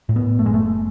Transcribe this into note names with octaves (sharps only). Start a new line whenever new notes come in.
A2
B3
F#1 A3
G#3
A3